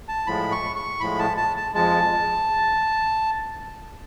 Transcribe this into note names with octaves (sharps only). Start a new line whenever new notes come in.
A5
A2 F3 G#3 B5
C#6
C#6
A2 F3 G#3 B5
A5
A5
A5
F2 F3 G#3 A5